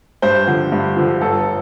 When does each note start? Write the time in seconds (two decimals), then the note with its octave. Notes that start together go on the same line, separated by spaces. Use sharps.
0.22 G2 C5
0.47 D3 F3
0.72 G2
0.97 D3 F3
1.21 G1 A4